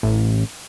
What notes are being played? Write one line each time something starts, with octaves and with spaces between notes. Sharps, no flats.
A1